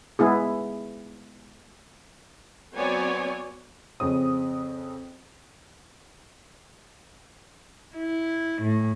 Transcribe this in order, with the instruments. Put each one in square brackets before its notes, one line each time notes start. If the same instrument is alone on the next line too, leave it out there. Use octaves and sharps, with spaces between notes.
[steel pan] G#3 B3 E4 G#4
[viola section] F#3 B3 C4 C#5 D5 G#5
[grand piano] F2 C#3 C4 D#6
[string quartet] E4
A2